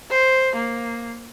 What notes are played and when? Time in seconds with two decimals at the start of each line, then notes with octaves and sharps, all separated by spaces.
0.11 C5
0.56 A#3